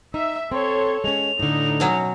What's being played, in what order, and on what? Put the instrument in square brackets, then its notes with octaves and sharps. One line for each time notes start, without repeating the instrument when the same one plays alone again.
[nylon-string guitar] D#4 [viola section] E5
[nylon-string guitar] C4 [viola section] A4 C#5 [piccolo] C6
[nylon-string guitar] G#3 C#4 [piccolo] F7
[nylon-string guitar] A2 D3 [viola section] D#4
[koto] B2 F#3 C#4